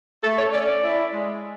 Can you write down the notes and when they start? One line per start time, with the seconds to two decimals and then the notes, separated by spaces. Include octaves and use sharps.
0.23 A3 A4
0.38 C#5
0.53 C#4 D5
0.68 D5
0.83 E4
1.13 G#3